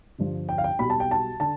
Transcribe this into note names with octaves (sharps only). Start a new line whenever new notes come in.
G1 G2 F3
G5
F5
G5
B1 B2 G3 B5
A5
G5
A5
D3 A5